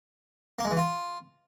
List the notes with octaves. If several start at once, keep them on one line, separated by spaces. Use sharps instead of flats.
A#3
G#3
E3
F4